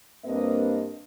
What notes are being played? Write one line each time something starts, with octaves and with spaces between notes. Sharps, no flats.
G2 A#3 C4 D4 B4 D#5